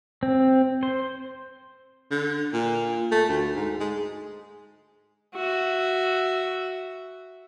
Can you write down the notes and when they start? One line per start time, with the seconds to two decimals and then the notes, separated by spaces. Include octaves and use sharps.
0.23 C4
0.83 C5
2.11 D3
2.53 A#2
3.12 A3
3.29 D2
3.56 G#2
3.80 G#3
5.34 F#4 E5